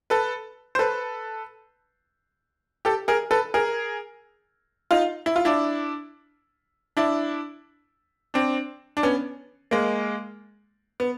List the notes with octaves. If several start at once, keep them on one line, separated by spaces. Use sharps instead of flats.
A4 B4
C5
A4 B4
G4 A4
G#4 A#4
A4 B4
G#4 A#4
D#4 F4
E4
F4
D4 E4
D4 E4
C4 D4
D4
B3 C#4
G#3 A#3
B3